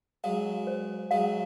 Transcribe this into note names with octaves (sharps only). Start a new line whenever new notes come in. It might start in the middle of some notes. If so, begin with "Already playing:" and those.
F#3 G#3 F5
C5
F#3 G#3 F5